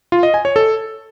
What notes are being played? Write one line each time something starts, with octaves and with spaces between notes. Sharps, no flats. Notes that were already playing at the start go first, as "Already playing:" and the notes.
F4
D#5
G#5
C#5
A4